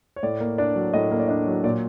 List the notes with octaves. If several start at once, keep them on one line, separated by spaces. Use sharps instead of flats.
C#5
A2 D5
A#3
D4 D5
F#3
A2 D#5
A#3
D5
D4 D#5
F#3
A#2 D5